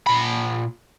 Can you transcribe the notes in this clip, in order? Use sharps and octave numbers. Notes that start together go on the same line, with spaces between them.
A#2 B5